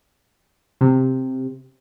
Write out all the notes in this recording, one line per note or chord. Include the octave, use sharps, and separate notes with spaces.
C3